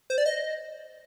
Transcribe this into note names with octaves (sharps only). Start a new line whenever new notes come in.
C5
D5
D#5